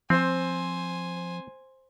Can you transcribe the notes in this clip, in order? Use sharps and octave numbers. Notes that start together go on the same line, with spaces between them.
F3 C4 C5 G#5